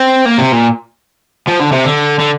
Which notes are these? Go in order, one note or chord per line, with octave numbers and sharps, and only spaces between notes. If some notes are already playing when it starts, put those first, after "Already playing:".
Already playing: C4
A#3
C3
A#2
F3
D3
C3
D3
D3